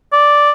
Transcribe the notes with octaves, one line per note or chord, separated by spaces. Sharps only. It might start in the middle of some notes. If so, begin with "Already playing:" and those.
D5